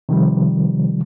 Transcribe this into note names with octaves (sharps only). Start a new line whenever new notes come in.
C3 D#3 F3 G3